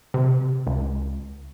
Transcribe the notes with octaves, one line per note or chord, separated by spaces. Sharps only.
C3
C#2